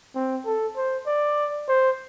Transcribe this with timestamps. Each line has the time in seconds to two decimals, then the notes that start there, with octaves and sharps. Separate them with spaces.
0.15 C4
0.46 A4
0.77 C5
1.07 D5
1.69 C5